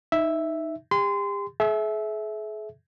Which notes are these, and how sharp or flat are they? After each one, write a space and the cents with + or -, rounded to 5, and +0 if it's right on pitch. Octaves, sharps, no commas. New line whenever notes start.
D#4 +0 E5 +0
G4 +40 C6 -30
G#4 +45 E5 -10